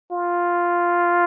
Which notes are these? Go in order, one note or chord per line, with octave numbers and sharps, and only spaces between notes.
F4